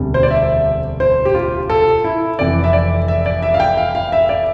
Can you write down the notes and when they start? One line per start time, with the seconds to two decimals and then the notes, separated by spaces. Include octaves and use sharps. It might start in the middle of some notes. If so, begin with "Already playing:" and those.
Already playing: E1 D2 C3 G3
0.14 C5
0.23 D5
0.31 E5
1.00 C5
1.25 G4
1.35 F4
1.70 A4
2.04 E4
2.39 F1 F2 E3 D5
2.64 E5
2.73 D5
3.08 E5
3.26 D5
3.42 E5
3.54 F5
3.60 G5
3.77 F5
3.95 F5
4.12 E5
4.29 D5